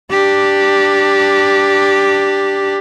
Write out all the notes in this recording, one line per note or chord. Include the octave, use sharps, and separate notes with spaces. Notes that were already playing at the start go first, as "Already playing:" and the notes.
D4 G4